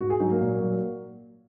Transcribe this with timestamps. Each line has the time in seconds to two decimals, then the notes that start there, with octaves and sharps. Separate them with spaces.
0.01 G#2 F#4
0.10 G#4
0.20 F#3 D#4
0.31 A#3
0.41 A#2
0.61 F#3